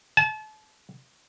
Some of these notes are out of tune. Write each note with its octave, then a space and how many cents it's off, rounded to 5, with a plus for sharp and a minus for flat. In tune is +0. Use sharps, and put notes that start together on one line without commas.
A5 -35